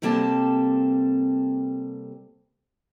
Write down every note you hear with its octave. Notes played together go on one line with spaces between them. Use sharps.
C3 G3 A#3 C4 A4 A5